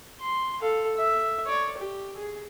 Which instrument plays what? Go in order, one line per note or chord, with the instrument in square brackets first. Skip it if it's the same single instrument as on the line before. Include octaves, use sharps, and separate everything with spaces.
[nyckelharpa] C6
A4 F5
E5
C#5 D5
G4
G#4